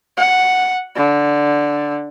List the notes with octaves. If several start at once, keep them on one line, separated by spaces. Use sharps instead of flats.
F#5
D3